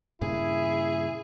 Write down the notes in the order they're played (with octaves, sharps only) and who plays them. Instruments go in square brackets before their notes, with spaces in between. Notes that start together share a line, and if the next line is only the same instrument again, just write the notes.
[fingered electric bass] G2 A#2 C#3 [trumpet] E4 [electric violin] G#4